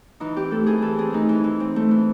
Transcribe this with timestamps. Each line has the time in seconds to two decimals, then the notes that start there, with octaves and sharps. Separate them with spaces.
0.20 E3 D#4
0.36 C4 G4
0.51 A3 A4
0.66 E3 G#4
0.82 E3 A4
0.98 C4 G#4
1.13 A3 D#4
1.29 E3
1.44 E3
1.60 C4
1.76 A3
1.91 E3